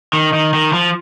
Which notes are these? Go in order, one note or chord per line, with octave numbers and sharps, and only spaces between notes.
D#3
D#3
D#3
F3